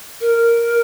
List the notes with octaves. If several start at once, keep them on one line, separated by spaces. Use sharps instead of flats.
A#4